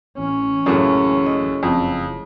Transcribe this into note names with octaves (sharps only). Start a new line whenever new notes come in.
A1 C#4
F#2 A2 C#3 A3 A#3 F#4
D#5
F#1 F2